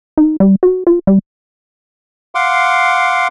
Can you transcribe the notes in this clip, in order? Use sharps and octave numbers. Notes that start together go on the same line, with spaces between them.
D#4
G3
F#4
F4
G3
F5 F#5 C6 D6